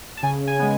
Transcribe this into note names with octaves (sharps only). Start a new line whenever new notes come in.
A5
C#3 G#5
G#5
G#3 B3